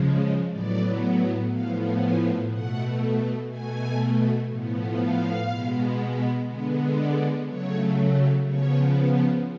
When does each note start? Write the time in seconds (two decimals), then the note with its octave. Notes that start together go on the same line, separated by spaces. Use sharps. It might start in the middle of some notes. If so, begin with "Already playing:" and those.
Already playing: C#3 F3 G#3
0.51 A2 F#3 B3 D5
1.51 A2 F3 B3 F5
2.00 G#5
2.49 B2 A3 F#5
3.49 B2 A3 G#5
4.48 A2 F3 B3
4.98 F5
5.47 B2 G#3 B3
6.47 D3 G#3 B3
6.97 D5
7.46 C#3 F#3 A3 C#5
8.45 C#3 F3 B3 C#5